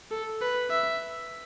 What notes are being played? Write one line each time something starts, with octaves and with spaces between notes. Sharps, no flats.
A4
B4
E5